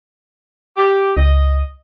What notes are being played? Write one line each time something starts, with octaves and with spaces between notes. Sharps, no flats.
G4
C#2 D#5